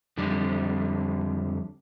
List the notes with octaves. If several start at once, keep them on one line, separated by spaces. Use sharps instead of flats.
F2 D3 G3